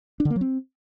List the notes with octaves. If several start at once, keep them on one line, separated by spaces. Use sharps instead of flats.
D4
D3
A#3
F#3
C4